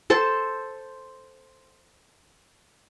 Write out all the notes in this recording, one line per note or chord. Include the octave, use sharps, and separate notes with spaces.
A4 C5 A5